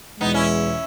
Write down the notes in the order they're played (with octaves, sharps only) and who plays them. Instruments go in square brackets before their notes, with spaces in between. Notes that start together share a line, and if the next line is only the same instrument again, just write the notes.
[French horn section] E2 B2 G#3 [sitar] B3 D#4
[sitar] C#4 E4